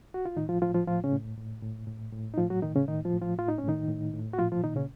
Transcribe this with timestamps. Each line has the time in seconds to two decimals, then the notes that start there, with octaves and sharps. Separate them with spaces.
0.14 F#4
0.26 F4
0.37 A2 D#3 D#4
0.49 F3 F4
0.62 A2 F3 F4
0.74 F3 F4
0.87 A2 F3 F4
1.04 C#3 C#4
1.12 A2
1.38 A2
1.63 A2
1.87 A2
2.13 A2
2.34 D#4
2.38 A2 F3 F4
2.50 F#3 F#4
2.62 A2 D#3 D#4
2.76 C#3 C#4
2.88 A2 D#3 D#4
3.05 F3 F4
3.13 A2
3.22 F3 F4
3.38 A2 F4
3.48 D#4
3.58 C#4
3.64 A2 D#3 D#4
3.88 A2
4.14 A2
4.34 F#4
4.39 A#2 F3 F4
4.52 F3 F4
4.63 A#2 D#3 D#4
4.76 C#3 C#4